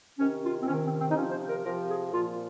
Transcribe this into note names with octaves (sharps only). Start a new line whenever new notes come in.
C3 D#3 C#4
F4
C4
C3 D#3 C#4
C4
C4
D#4
C3 F3 C#4
C5
A#4
C3 F3 A#4
G#4
A#2 F3 F4